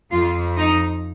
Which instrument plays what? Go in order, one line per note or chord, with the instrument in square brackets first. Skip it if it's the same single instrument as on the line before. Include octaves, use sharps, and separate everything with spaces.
[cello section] F2 F3 F4
D#4